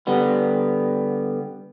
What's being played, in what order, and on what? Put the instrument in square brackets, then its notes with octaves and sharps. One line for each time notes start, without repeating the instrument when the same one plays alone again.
[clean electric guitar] D3 G3 B3